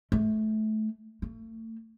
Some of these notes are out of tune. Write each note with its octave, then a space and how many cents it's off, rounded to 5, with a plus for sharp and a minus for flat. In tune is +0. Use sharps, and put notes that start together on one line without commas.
A3 -25
A3 +35